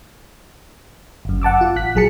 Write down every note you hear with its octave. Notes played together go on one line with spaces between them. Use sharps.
G1 F#2
F#5 A5 D6 E6
F4
A1 F#6 B6
A#1 F#3 G#4 A5 C#7